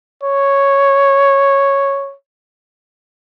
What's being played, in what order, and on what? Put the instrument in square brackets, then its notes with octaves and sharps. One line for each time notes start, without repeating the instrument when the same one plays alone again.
[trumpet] C#5